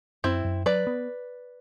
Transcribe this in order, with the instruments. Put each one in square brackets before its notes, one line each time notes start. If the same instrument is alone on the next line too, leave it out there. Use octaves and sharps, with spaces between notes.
[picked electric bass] F#2 [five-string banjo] C4 E4
[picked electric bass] F#2
[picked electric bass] F#3 [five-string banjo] B4 D5
[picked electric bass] B3